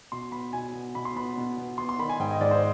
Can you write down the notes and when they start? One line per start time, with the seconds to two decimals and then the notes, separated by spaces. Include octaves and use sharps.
0.12 B2 C6
0.32 B3 B5
0.53 B2 G#5
0.74 B3
0.95 B2 B5
1.05 C6
1.16 B3 B5
1.37 B2
1.58 B3
1.78 B3 C6
1.89 C6
1.99 D#3 B5
2.09 G#5
2.20 G#2 G5
2.31 D#5
2.41 G#2 D5
2.51 C5